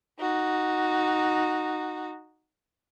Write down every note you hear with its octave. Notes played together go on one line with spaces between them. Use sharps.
D#4 F#4